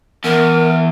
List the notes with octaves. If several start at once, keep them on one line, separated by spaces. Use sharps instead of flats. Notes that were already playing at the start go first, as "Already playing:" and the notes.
E2 A#4